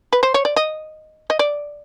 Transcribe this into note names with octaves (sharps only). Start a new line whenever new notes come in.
B4
C5
C#5
D5
D#5
D#5
D5